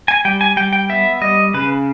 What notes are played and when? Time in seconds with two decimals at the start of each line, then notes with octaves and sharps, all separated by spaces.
0.08 G#5
0.25 G3 G5
0.41 G#5
0.57 G3 G5
0.73 G5
0.89 B3 E5
1.21 G3 D#5
1.54 C#3 B4